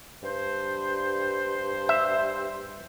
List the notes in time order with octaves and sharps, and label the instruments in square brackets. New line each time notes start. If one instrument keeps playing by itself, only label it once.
[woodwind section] G2 C5
[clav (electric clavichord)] E5